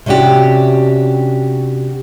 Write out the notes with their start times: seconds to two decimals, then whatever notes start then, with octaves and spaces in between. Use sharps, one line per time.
0.06 C3 C#4 D4 F#4 G4